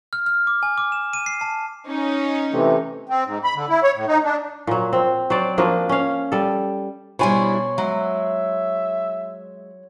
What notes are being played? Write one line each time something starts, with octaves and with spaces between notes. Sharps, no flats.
F6
F6
D6
G#5
D6
E7
D#7
C7
A5
C#4 D#4
C3 E3 A3
C4
G#2
B5
D3
E4
C#5
A2
D#4
D4
A#2 F#3
C4
F#3 C5 D5
F3 A#3 D4 F#4
C#4 F5
G3 A4
B2 G3 D4 E4 C#5 G#5 C6
F#3 G#3 E5